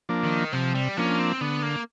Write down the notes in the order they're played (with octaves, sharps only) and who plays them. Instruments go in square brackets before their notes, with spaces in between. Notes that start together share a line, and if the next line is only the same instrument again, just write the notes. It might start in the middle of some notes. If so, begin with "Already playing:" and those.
[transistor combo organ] F3 A#3 D4
[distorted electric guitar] D#3
[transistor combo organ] C3 [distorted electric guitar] F3
[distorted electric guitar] G3
[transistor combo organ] F3 A#3 D4 [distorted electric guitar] C#4
[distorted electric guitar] C4
[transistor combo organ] D3 [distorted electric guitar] B3
[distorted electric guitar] A#3